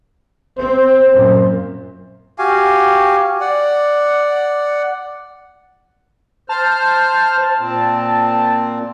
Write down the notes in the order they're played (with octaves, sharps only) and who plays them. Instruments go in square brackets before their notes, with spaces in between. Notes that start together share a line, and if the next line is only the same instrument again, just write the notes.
[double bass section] C4 [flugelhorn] C5
[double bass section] F#2 A#2
[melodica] F#4 G4 F5 G#5
D5 F#5
[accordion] C5 F6 [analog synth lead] A5
[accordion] A#2 C4